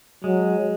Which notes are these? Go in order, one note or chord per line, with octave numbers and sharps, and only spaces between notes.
F#3 G#3